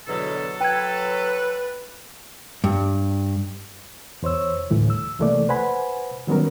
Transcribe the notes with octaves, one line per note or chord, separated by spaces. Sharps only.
E2 B2 D3 F#3 A4
B4 G5 G#6
G2
E2 C5 C#5 E6
D2 A2 E3 G3
E6
C2 C3 E3 A3 A#3 D5
B4 C5 F#5 G#5 B5
D#3 F#3 G3 B3 C#4 A#4